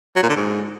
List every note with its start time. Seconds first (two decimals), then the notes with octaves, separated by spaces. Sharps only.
0.16 F#3
0.23 A#2
0.30 D3
0.36 G#2